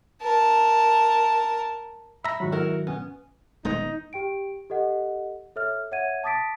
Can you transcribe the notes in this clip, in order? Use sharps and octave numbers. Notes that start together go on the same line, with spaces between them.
A#4 A5
E5 A#5 B5
G#2 D#3 F#3 F#4
E4 A#4
B3 C#4
D#1 G#3 B3 D#4
G4 G5 D7
G4 A4 D#5 F#5
A4 C#5 E5 F6
C#5 E5 F#5 G#6 D#7
A5 D6 D#6 A6 B6 D7